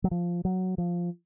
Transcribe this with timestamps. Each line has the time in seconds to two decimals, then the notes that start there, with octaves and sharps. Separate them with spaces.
0.04 F#3
0.11 F3
0.45 F#3
0.78 F3